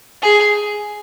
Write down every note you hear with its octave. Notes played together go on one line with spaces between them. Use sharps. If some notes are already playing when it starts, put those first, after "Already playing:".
G#4